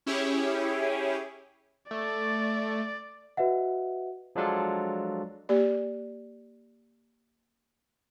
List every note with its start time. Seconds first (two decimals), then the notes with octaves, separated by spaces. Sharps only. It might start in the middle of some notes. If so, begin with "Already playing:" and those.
0.06 C#4 E4 G4 G#4 C#5
1.91 A3 D5
3.37 F#4 B4 D#5 E5 F#5
4.36 F3 F#3 G#3 D4 F4 A4
5.49 A#3 G4 D5